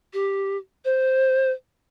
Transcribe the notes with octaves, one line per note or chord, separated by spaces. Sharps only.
G4
C5